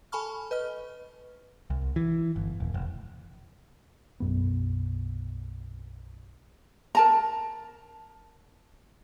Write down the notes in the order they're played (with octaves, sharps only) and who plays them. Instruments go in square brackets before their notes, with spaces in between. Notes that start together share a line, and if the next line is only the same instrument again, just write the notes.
[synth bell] A4 G#5 A5 B5 C#6 F6
B4 D#5 F6
[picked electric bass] C2
E3
G1
D#1
F1
B1 F#2 B3
[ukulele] A#4 A5 A#5